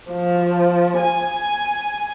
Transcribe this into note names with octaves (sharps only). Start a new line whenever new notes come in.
F3
G#5